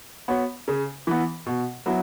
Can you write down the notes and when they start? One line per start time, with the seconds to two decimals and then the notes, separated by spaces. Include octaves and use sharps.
0.28 B3 F#4 C#5
0.68 C#3
1.07 E3 B3
1.46 B2
1.86 F#3 B3 E4